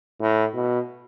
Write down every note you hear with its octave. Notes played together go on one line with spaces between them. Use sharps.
A2
B2